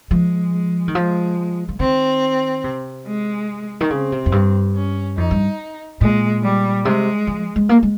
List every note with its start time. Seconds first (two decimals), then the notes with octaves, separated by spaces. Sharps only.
0.11 F3 G#3
0.53 G#3
0.88 D#3
0.95 F3 G#3
1.68 F3
1.80 D#3 C4
2.64 C3
3.06 G#3
3.81 D#3
3.90 C#3 C4
4.12 C3
4.26 F2
4.32 G2
4.75 C#4
5.17 F2 D#4
5.31 G2
6.01 A#2 G#3
6.43 G3
6.85 C3 G#3
7.27 F3
7.56 G#3
7.69 A#3
7.83 G#3